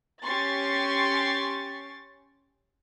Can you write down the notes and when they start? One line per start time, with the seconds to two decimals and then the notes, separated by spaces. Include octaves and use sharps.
0.23 C#4 G4 C6 C#6 A6